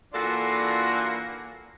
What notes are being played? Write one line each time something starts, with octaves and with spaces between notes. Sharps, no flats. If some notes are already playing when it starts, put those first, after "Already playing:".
E3 A#3 D4 F4 F#4 A4